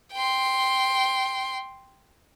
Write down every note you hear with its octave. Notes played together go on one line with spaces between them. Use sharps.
G5 C6